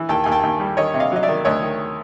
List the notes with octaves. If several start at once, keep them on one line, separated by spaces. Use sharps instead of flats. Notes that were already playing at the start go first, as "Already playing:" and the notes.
Already playing: E3
D#2 G5 A5
D#2 G#5
G5 A5
D#2
G3
D#3 C#5 D#5
C3
D#5 F5
F#3 D#5
D5 E5
D#3
D2 C#5 D#5
D#3